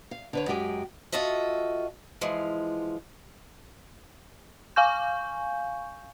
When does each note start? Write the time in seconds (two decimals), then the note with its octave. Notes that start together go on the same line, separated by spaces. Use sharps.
0.11 F5
0.33 D3 B4 C#5
0.48 F#2 G#3 G4 G5 G#5
1.12 F4 F#4 A4 D#5 E5
2.21 E3 F3 G#3
4.76 F5 G#5 C#6 G6